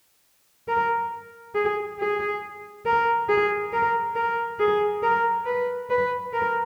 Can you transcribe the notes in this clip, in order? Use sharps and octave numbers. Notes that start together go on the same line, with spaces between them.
A#4
G#4
G#4
A#4
G#4
A#4
A#4
G#4
A#4
B4
B4
A#4